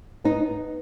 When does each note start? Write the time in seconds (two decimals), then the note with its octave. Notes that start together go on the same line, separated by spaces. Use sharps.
0.24 B3 D#4